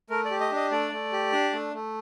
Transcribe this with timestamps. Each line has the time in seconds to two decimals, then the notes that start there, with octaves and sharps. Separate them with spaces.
0.10 A3 A#4
0.25 D5
0.31 G4
0.41 D#5
0.51 D4 D#5
0.72 A3 D5
0.92 A3
1.12 G4
1.32 D4
1.53 A3
1.74 A3